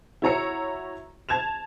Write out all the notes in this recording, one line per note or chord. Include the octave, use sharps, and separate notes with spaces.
E4 F#4 C#5 A#5 E6 C#7
A5 G#6 E7 F7